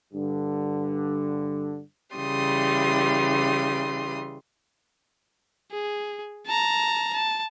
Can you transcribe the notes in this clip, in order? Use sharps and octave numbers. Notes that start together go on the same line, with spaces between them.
G2 D3
C#3 E3 G3 C6 D#6
G#4
A5 A#5
A5